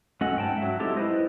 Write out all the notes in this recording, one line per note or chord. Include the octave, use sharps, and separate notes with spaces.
F#3 G#3 C#4 A4 D#5 F#5
G#2 G5 A5
F#3 E5
G#3 C4 D#4 E4 G4 A4
E4 F4 B4 C5 D#5